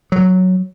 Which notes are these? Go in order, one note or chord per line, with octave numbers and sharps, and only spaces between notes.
F#3